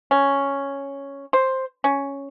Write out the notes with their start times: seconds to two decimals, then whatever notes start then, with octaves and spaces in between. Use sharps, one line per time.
0.11 C#4
1.33 C5
1.84 C#4